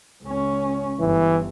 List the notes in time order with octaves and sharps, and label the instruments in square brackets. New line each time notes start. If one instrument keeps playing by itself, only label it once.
[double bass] C#2 C#4
[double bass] G1 [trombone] E3